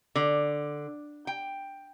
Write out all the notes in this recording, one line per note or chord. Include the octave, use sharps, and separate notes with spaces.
D3
G5